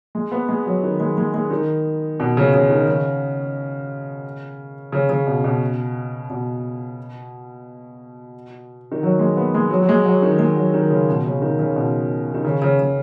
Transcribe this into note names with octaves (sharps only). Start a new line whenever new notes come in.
G#3
B3
G#3
F#3
D#3
G#3
G#3
G#3
D#3
B2
C#3
C#3
D#3
C#3
C#3
C#3
B2
B2
B2
D#3
F#3
G#3
B3
G#3
F#3
F#3
G#3
F#3
D#3
G#3
F#3
D#3
C#3
B2
C#3
D#3
C#3
B2
D#3
C#3
C#3
C#3